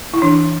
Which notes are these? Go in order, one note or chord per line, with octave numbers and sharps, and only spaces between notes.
E4
E3 D4